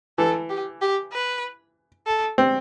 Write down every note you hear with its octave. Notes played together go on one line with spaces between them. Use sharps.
E3 A4
G4
G4
B4
A4
C4